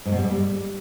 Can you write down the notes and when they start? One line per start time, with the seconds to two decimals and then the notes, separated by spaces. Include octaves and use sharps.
0.05 G#2
0.12 B2
0.18 G3
0.24 A3
0.30 G3